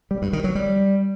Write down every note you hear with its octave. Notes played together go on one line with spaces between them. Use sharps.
G3
G2
D#3
F#3
G3